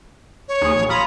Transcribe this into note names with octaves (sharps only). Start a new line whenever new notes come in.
C#5
D#2 G#4
A#1
F4 A#5 B5 D#6